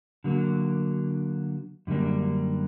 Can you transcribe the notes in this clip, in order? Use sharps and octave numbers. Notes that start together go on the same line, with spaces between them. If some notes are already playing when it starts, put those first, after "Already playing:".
D3 F#3 A#3
F#2 D3 G3 A#3 D4